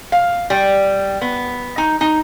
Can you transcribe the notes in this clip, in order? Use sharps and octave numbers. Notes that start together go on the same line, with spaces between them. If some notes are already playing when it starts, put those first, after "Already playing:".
F5
G3
B3
D#4
D#4